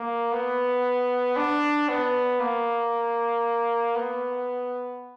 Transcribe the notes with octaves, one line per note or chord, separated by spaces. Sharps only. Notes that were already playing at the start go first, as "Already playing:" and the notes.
Already playing: A#3
B3
D4
B3
A#3
B3